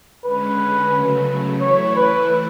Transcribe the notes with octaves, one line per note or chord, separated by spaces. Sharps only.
D3 G#3 C#4 B4
C#3 F#3 A3
E3 A3 E4 C#5
B4